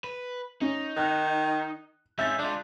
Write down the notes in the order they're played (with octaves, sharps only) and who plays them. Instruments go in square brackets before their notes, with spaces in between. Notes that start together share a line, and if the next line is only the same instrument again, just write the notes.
[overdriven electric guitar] B4
[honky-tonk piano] C#4 [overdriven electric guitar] D#4
[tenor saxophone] D#3 [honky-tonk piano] F#6
[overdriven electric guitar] G#3 C#4 [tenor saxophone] E5 [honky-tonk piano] G6 A6 B6
[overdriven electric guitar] G#3 F4 [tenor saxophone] D4